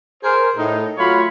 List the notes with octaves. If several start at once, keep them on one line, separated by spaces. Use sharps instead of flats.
G#4 A#4 C5
A2 D#4
F#3 A3 F4 C#5 F5 B5